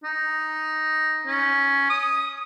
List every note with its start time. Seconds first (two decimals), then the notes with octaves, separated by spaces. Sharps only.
0.04 D#4
1.27 C#4
1.89 D#6